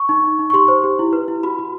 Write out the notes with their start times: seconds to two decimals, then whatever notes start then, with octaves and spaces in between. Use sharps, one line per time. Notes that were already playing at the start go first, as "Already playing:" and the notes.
Already playing: C#6
0.09 D#4
0.24 D#4
0.39 D#4
0.50 C#6
0.53 G4 C6
0.68 C5
0.84 G4
0.99 E4
1.13 B4
1.28 E4
1.43 F#4 B5
1.59 F#4